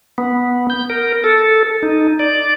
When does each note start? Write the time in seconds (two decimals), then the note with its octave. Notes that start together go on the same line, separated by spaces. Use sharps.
0.18 B3
0.70 G6
0.90 A#4
1.24 A4
1.83 D#4
2.19 D5